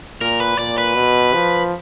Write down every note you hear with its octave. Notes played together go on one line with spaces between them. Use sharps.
A#2 A#4
B4
A#2 D5
B4
B2
F3